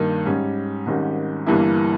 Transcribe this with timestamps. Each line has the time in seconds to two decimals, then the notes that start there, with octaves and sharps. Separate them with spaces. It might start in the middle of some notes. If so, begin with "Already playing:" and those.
Already playing: G2 D#3 A#3
0.26 G#2 G3 C#4
0.86 G#1 G#2 D#3 G3 C#4
1.46 G1 G2 E3 A#3 E4